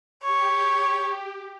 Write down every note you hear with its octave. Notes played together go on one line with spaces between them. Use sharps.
G4 C#5